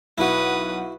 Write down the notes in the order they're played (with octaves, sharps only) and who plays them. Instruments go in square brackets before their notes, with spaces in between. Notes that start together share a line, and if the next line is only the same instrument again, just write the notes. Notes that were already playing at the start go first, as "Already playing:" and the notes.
[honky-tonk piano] B1 F#5 [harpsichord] E4 F#4 [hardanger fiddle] B4 D#6